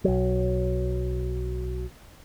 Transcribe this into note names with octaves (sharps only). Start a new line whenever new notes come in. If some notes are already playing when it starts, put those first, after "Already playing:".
B1 F#3